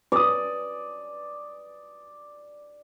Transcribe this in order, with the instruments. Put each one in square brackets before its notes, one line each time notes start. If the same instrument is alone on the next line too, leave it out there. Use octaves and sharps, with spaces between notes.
[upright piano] B4 D#6 [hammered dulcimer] D5